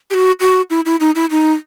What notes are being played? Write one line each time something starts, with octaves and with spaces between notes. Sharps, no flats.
G4
F#4
F#4
E4
E4
D#4
E4
D#4